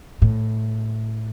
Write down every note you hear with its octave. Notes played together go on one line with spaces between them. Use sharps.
A2